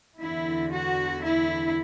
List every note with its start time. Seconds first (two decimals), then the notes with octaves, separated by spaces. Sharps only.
0.18 E2 D3 E4
0.71 F#4
1.22 E4